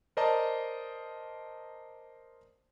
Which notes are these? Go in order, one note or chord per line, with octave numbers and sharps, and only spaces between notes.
A#4 C5 D5 D#5 A5 A#5